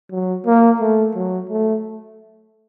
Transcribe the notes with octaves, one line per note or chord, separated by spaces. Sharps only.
F#3
A#3
A3
F#3
A3